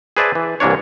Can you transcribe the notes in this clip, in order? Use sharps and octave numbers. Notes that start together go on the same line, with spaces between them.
G#4 B4 C5 D5 E5 A5
E3
C2 E3 A#3 D4 C#5